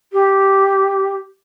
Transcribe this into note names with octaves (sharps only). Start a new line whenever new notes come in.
G4